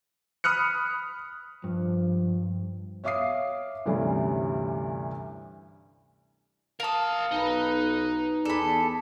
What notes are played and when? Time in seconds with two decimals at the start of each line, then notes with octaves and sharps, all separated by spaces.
0.44 B5 D#6 F6 F#6 C#7
1.64 G2 F3
3.04 C#5 E5 F5 D6 D#6 C7
3.86 D2 G2 C3 E3 G3 C#4
6.80 A#4 F5 A5 D#6
7.32 B1 D#4 B4
8.45 E2 G#4 A4 D5 B5